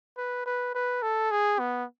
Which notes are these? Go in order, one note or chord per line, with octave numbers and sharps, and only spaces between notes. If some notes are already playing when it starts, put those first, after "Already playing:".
B4
B4
B4
A4
G#4
B3